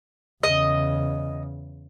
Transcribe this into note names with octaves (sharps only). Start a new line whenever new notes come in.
E2 C#3 D#5